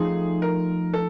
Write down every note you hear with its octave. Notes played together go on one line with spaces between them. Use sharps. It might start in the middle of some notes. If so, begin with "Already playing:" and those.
Already playing: F3 A3 C4 D#4 G#4
A#4
A4